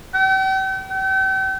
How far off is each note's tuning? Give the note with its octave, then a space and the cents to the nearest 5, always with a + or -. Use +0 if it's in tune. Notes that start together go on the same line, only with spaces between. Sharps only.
G5 -45
G5 -40